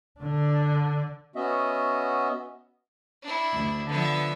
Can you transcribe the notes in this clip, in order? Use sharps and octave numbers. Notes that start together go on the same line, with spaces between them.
D3 D4
B3 C#4 F#4 D#5 E5
D4 E4
D2
D3 F3 B3 E5